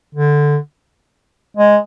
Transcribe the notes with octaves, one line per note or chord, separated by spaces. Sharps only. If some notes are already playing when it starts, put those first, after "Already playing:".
D3
G#3